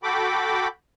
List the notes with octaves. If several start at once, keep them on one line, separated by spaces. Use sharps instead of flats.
F#4 A4 G5 B5 D6